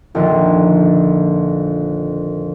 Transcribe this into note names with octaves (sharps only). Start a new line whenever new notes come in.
A#1 F2 D3 D#3